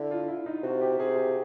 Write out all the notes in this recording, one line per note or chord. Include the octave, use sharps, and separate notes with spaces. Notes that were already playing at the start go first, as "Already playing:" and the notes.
Already playing: D3 E4
F4
E4
D#4
C3 F#4
G4
C3 G#4
G#4